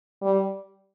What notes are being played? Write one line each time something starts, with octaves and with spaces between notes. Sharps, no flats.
G3